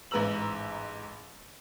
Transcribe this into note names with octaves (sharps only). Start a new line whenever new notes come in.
A1 G#2 B4 A#5 E6 F#7